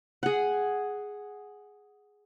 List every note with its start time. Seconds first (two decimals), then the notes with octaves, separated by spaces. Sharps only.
0.23 G#4 F#5